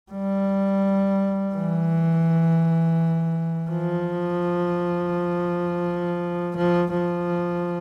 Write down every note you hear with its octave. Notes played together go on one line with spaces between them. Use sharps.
G3
E3
F3
F3
F3